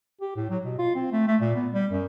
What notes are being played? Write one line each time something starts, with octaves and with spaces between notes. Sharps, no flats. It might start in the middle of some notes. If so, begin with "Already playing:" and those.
G4
A2
F#3
B2
F4
C4
A3
A3
A#2
B3
G3
F#2